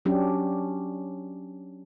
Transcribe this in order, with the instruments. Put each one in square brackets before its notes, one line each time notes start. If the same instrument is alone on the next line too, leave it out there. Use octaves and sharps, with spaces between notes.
[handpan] F#3 C#4 D4 G4